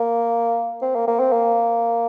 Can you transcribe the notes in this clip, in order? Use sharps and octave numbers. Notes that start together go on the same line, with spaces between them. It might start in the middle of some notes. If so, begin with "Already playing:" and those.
Already playing: A#3
C4
A#3
A#3
C4
A#3